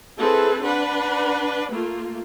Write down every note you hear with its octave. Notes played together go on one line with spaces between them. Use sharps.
C4 E4 G#4 A4 B4
D4 B4 F#5 B5
A3 A#3 F4